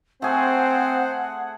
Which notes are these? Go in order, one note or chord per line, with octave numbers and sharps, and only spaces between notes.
A3 C4 G#4 C5 F#5